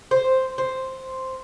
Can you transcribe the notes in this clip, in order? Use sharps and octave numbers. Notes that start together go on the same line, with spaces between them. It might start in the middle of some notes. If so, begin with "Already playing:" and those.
C5
C5